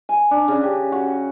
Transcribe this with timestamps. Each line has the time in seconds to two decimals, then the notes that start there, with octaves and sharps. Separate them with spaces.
0.09 G#5
0.31 D4
0.48 C#3
0.63 G4
0.92 F#4